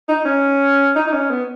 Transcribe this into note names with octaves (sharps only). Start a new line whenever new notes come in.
D#4
C#4
D#4
D#4
C#4
B3